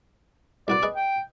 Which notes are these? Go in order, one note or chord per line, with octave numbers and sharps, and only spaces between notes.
C2 F#4 B4 D5
G#4 B4 D#5
G5